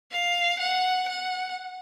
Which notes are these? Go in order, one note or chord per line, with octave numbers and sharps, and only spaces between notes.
F5
F#5
F#5